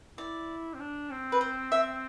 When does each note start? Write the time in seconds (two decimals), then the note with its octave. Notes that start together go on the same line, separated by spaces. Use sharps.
0.18 E4 D5
0.74 C4
0.80 D4
1.11 C4
1.32 B4
1.41 C5
1.72 E5